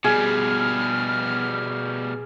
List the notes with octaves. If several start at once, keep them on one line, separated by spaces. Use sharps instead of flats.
B2 G3 G#4 F6